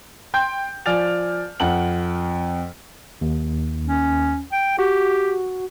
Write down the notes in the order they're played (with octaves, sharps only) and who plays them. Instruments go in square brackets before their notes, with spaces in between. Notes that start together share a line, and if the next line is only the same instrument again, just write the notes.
[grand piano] G5 C6 G6
F3 D5 G#5 F6 A6 F7
F2 F#5 F#7
[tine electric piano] D#2
[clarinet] C#4
G5
[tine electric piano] F#4 [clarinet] G4